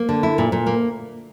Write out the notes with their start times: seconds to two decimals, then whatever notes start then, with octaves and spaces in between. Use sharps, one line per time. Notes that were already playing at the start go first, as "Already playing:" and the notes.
Already playing: A#3
0.09 D3
0.23 E4
0.38 A#2
0.52 A#2
0.67 A#3